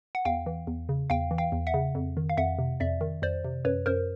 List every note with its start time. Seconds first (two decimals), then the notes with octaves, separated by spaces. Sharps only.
0.15 F#5
0.25 E2 F5 G5
0.46 E3
0.67 E2
0.89 C#3
1.10 E2 F5 G5
1.31 E3
1.38 F5 G5
1.52 E2
1.67 E5 F#5
1.74 C#3
1.95 F2
2.17 D#3
2.30 F5
2.37 F2 E5 F#5
2.59 C3
2.80 F2 D5 E5
3.01 D#3
3.22 F2 C5 D5
3.45 C3
3.65 F#2 B4 C#5
3.86 F#2 A#4 C5